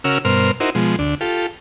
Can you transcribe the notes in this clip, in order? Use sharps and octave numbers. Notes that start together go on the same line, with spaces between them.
C#3 C#4 F#4 A#4 E6 F6
G2 B2 A#4 C5 F6
D#4 E4 F#4 A#4 C5
B2 F3 G#3
D2 D4
F4 G4 A4